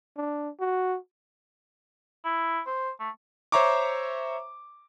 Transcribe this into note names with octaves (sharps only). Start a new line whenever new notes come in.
D4
F#4
E4
C5
A3
C5 C#5 E5 A#5 C#6 D6